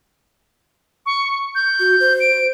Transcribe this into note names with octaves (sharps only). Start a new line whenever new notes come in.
C#6
G6
F#4
C5
D7